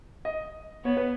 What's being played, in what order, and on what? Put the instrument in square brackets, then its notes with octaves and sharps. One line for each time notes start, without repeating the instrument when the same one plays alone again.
[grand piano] D#5
[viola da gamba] B3 [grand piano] C#5
[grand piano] B4